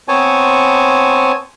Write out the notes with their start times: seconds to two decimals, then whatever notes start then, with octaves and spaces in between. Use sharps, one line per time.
0.08 B3 C4 C5 C#5 G#5 A5